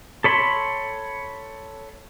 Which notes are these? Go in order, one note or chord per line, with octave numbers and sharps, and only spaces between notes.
A4 C#5 B5 C6